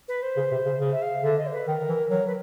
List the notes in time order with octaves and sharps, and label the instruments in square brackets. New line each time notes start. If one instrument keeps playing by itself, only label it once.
[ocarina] B4
C5
[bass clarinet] C#3
C3
C#3
C#3
[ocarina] E5
F5
[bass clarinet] D3 [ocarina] E5
[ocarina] D#5
C5
B4
[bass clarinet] D#3 [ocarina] A#4
[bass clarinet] E3
[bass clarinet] F#3 [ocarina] A#4
[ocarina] B4